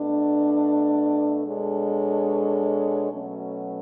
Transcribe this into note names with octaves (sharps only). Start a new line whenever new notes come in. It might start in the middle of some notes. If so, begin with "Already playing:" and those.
Already playing: B2 A3 D4
B2 G#3 D4 A4 C#5
B2 F#3 A3 C#4